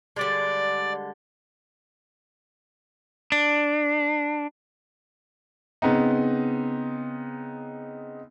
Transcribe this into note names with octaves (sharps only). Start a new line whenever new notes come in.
D3 G3 G#3 D5
D4
C#3 B3 C4 D#4